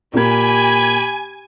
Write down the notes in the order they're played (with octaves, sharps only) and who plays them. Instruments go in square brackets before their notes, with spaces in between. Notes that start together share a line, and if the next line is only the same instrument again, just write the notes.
[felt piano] A#2 A#3 G#6 [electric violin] G4 B5 [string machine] G#5